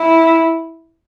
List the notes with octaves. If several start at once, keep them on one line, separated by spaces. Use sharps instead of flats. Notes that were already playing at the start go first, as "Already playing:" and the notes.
Already playing: E4